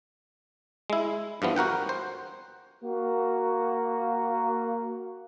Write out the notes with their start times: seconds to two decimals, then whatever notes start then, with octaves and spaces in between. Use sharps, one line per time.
0.90 G#3 E4
1.42 G2 E3 F3 B3
1.56 F#4 A#4 F#5 G5
1.89 C5
2.83 A#3 F#4